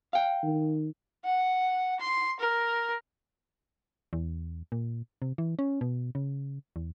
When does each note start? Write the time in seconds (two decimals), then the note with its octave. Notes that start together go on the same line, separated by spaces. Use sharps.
0.13 F5 G5
0.42 D#3
1.24 F#5
2.00 C6
2.40 A#4
4.13 E2
4.72 A#2
5.22 C3
5.38 E3
5.59 C#4
5.81 B2
6.15 C#3
6.76 E2